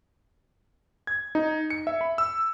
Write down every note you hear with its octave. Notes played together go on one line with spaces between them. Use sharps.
G#6
D#4
C#7
E5
B5
E6